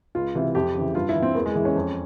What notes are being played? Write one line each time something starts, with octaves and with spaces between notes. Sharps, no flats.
C#2 F4
C3 E3
F2 G4
C#3 E3
G2 F4
E4
E3
C4
E2 A#3
G#3
E3
C#4
F2